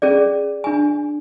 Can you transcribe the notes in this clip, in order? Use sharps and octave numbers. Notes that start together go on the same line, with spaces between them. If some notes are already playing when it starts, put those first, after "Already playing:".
C#4 G#4 D5
D4 G#5